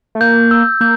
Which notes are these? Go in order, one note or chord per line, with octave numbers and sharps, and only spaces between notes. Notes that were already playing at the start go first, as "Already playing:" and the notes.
A3
A#3 G6
E6
A#3 G6